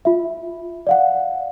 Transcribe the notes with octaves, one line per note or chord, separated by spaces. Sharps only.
F4 E5
D5 F5 F#5